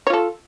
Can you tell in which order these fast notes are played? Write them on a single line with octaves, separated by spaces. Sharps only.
C#5 F4 A4